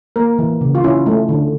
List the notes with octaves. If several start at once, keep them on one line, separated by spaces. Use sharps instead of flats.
A#3 A#4
E3
C#3
F4
C#4 E4
A3
D3